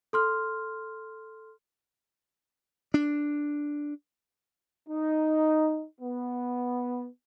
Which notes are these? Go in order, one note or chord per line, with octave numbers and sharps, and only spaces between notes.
A4 C6 F6
D4
D#4
B3